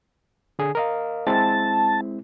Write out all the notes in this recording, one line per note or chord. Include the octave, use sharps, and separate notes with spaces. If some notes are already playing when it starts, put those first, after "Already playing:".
D3 G#4
A#4 D#5 F5
G#3 C4 E4 A5